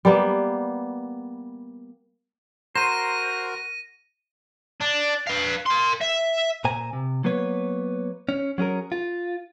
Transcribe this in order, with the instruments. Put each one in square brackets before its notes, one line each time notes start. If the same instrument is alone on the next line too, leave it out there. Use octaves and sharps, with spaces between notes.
[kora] G3 A#3 B3
[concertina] F#4 A#4 A#5 [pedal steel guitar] C5 [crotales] A#6 D#7
[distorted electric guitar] D4
B4 F5
A#4 C6
E5
[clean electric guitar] A#2 C5 G#5 A#5
C3
F#3 A#3 B3 B4 C#5
C#4
F#3 C#4 G#4 A#4
F4